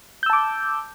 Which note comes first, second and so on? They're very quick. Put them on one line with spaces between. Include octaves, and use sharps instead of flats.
G6 E6 A5 D6